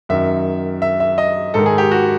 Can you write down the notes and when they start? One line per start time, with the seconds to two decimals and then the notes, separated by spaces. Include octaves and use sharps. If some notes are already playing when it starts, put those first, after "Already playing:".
0.09 F#2 D#3 E5
0.82 E5
1.00 E5
1.18 D#5
1.54 G#2 D#3 A4
1.66 G#4
1.78 G4
1.91 F#4